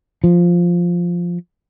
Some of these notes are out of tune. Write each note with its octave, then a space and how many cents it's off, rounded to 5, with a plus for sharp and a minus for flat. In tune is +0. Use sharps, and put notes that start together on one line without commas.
F3 +0